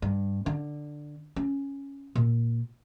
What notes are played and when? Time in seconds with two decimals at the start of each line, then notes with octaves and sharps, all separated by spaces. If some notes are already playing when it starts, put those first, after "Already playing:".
0.02 G2
0.46 D3
1.36 C#4
2.15 A#2